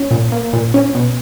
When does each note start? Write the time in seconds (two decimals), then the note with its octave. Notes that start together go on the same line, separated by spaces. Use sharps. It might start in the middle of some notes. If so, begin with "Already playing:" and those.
Already playing: C#4
0.11 A#2
0.32 A#3
0.53 A#2
0.74 C#4
0.95 B2